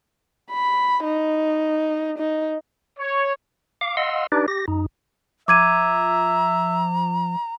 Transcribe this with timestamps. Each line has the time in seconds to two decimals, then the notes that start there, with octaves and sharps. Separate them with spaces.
0.51 B5
1.04 D#4
2.18 D#4
2.99 C#5
3.81 F5 D6
3.97 D#5 F5 F#5 C6 E6
4.32 D4 D#4 G4 B4 D5
4.48 G4 A#6
4.68 F#2 D#4
5.48 F3 E5 A#5 D6 G#6 D#7